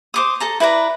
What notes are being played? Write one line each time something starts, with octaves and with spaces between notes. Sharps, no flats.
C5 D6 D#6
A4 A5 A#5
E4 B4 D5 A#5